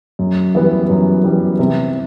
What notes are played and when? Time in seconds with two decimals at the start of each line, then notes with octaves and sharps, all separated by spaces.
0.19 F#2
0.55 E3 G3 B3
0.89 F#2
1.24 E3 G3 B3
1.59 C3